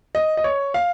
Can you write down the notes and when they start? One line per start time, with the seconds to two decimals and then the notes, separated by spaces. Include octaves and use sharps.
0.15 D#5
0.37 D#5
0.44 C#5
0.74 F5